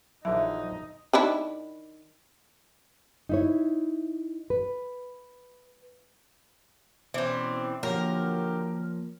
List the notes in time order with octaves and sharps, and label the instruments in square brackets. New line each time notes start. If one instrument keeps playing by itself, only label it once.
[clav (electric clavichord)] A#1 D3 E3 [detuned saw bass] F#3 [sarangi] D#4 [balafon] E5
[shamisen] D#3 D4 E4
[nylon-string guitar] D#4 E4 C#5
B4
[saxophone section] B2 C#4 D5 [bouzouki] E3 C4 [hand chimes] C5
[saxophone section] D3 F#3 G4 [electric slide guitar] F3 A#3 [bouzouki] A#4 [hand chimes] C#5